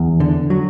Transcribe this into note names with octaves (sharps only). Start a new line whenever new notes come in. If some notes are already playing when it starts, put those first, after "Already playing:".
Already playing: E2
D3
F#3